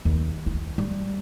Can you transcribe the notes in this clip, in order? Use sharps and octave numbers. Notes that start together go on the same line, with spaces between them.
D#2
E4
G3